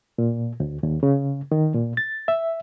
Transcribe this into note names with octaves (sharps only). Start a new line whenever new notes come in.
A#2
D2
D#2
C#3
D#3
A#2
A6
E5